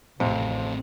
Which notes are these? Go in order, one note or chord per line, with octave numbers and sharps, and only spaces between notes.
A1 F2 A2 C3 C4